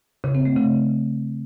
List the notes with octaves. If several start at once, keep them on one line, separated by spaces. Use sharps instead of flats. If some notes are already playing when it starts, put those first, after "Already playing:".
C#3
C4
A3
C#3